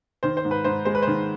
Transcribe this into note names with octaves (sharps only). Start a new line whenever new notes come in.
D#3 C5
C5
G#2
B4
G#2 C5
G#3 C5
B4
C5
D#3